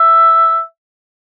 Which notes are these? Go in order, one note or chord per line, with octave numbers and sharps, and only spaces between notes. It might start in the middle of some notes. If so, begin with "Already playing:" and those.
Already playing: E5